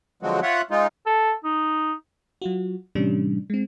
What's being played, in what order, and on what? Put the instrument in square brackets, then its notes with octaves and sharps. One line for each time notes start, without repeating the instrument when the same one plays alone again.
[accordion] D3 F3 F#3 G#3 C4 F#4
F4 C#5 E5 F#5
G#3 D#4 F4
[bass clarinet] A4
D#4
[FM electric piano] F#3 F4 F#4
A2 C3 E3 G3 C#4 D4
G#3 C4